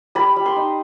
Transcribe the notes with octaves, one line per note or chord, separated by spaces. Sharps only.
G3 B5
G3
C6
D#4